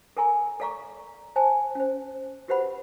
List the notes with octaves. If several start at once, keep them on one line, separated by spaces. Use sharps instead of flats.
A4 A#4 G#5 A#5 C6
A4 D5 F5 A#5 C#6 D6
C5 G#5 A5
C#4 C5
F#4 G4 B4 C5 F#5 B5